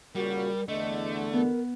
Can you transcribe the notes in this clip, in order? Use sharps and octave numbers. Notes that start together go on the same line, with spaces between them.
A#2 C#3 G3 F#4 A#4
E2 D3 A3 D#5
B3 A#4